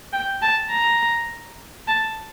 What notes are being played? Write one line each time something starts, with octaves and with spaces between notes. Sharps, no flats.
G5
A5
A#5
A5